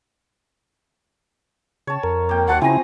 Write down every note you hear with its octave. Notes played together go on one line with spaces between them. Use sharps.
C#3 C#5 A5
F2 A#4
A#3 G5
D#2 F#3 F#5 A5 C6
C#3 F3 C4 E4 G#5 A#5